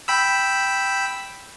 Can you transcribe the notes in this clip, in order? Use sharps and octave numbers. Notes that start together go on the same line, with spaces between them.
G5 B5 E6